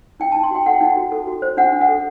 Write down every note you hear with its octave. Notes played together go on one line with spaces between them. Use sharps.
D#4 G5
D#4 A5
C6
F#4 G5
A4 F#5
G5
D#4 F#5
F#4
A4
F#4
C5
D4 F#5
D4
F#5
A4